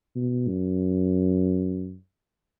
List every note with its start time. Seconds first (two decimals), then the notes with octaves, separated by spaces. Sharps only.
0.16 B2
0.49 F#2